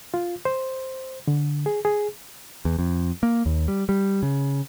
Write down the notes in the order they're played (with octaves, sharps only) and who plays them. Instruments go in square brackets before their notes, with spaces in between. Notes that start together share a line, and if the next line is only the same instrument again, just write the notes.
[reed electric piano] F4
C5
D3
G#4
G#4
[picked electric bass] E2
F2
A#3
D#2
G3
G3
C#3